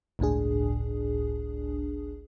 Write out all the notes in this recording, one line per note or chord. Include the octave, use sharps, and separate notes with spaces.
G1 C#2 A2 D4 G#4